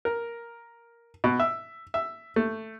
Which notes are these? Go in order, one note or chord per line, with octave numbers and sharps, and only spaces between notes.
A#4
B2
E5
E5
A3